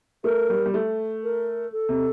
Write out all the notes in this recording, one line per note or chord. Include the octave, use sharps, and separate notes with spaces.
A3 A#4
G3
G3
A3
A#4
A4
C3